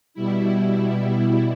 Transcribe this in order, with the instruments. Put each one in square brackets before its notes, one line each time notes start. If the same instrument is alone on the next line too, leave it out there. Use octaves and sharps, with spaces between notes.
[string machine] B2 G3 E4